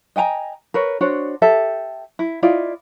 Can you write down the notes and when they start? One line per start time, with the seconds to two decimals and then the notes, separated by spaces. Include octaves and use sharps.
0.16 D#5 G5 G#5 A#5
0.74 A#4 B4 C#5
1.01 D4 F#4 C5 C#5
1.42 G4 A4 E5
2.19 E4
2.43 E4 F4 D5 D#5